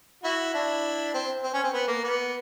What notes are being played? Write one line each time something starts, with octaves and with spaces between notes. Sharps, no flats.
E4 F#4
D4 E4
C4
C4
C#4
C4
B3
A#3
B3